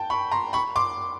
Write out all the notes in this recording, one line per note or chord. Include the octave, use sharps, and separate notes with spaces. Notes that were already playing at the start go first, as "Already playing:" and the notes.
Already playing: G5 A5
B5 C#6
A#5 C6
B5 C#6
C6 D6